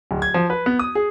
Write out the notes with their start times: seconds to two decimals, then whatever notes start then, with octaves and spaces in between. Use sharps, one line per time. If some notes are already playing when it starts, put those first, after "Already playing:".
0.11 D1
0.22 G#6
0.34 F3
0.50 B4
0.66 B3
0.79 D#6
0.95 G#4